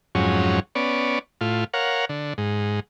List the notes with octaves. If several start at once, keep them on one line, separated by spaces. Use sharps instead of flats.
F2 G#2 F#3 C#4
B3 C#4 D5
A2 F4
A#4 C#5 F5 F#5
D3
G#2